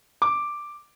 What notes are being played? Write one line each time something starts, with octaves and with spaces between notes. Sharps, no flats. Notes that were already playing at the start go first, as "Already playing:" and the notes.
D6